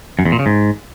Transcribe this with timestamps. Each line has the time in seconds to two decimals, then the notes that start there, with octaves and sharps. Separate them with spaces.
0.19 F#2
0.25 E2
0.32 A#2
0.39 C#3
0.46 G#2